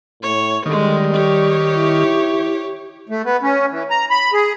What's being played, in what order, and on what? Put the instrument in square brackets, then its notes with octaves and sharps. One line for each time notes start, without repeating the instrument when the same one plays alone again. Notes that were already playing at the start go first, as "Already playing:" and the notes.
[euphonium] A2 [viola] C#5
[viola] D3 G#3 [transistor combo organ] D#3 [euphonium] G3
[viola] G4 C#5
[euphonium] E4
[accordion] A3
B3
C#4
E3
A#5
B5
G#4